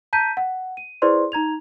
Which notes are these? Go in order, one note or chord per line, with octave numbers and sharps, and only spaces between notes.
A5 A#5 G6 B6 D#7
F#5
D#7
E4 G#4 B4 C5 D5 C6
D#4 A#5 G#6 F7